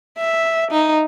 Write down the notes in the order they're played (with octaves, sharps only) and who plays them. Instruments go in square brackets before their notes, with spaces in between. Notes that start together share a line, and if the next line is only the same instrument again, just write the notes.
[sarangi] E5
D#4